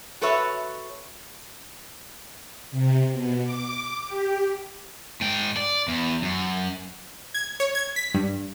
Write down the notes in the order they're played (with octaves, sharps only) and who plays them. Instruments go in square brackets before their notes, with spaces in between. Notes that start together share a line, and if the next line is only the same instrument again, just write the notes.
[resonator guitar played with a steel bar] F#4 A4 B4 C#5 E5
[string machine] C3
B2
D6
G4
[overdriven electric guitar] G#2 G5
D5
E2
F#2
[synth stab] G#6
C#5
G#6
B6
G2